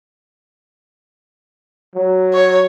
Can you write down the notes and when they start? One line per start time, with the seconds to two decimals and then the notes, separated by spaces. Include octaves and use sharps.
1.95 F#3
2.33 C#5